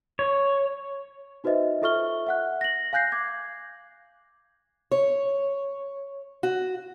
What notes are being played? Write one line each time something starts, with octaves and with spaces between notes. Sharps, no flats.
C#5
D#4 F#4 B4 C5 D#5 E5
F4 A4 E5 C#6 F6 G7
E5 F#5 F#6
A#6 F#7
F5 G#5 F#6 G6 A#6 C7
D6 G#6
C#5
F#4